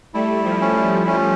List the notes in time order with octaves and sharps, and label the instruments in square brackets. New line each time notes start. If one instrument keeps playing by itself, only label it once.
[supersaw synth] G3 A3 [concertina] E4
[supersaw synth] F3 G3
[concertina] C#4
C#4